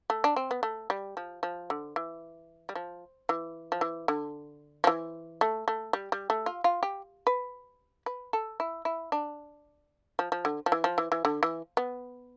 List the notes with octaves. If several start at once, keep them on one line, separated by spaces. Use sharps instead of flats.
A3
D4
C4
B3
A3
G3
F3
F3
D3
E3
G3
F3
E3
F3
E3
D3
F3
E3
A3
A3
G3
G3
A3
F4
F4
G4
B4
B4
A4
E4
E4
D4
F3
F3
D3
F3
E3
F3
E3
E3
D3
E3
B3